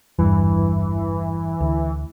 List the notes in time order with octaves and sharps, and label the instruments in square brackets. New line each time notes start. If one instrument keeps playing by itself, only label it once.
[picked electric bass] G#1 E2 G2 [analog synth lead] E3
[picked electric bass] D2